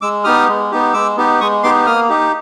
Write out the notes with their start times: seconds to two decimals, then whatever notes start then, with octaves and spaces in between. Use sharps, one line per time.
0.01 G#3 D6 E6
0.24 B3 D#4 G4 D#6 F6
0.48 G#3
0.71 B3 D#4 G4
0.93 G#3 D6 E6
1.17 B3 D#4 G4
1.41 G#3 C#6 D#6
1.63 B3 D#4 G4 C6 D6
1.86 A#3 D#6 F6
2.09 D#4 G4